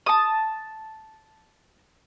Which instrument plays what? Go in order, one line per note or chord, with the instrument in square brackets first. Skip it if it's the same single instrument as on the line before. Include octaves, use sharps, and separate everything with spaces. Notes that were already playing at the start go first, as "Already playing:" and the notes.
[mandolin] A5 D#6